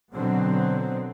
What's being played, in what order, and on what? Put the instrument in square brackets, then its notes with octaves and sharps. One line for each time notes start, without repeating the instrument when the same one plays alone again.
[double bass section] B2 D3 F#3 C4